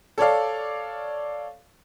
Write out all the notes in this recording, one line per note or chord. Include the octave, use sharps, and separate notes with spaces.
A4 C#5 D5 F5